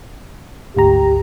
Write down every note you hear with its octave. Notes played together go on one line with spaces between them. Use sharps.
G#1 D2 G4 A#5